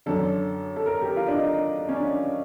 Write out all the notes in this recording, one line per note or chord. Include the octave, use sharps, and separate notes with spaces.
F#2 D3 A4
A4
A#4
G4
F4
D4
D#4
C#4
D4